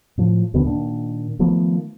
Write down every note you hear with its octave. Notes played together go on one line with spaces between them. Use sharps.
A2 F3
D2 B2 D3 B3
A#2 D#3 D4
D#3 F3 A3 B3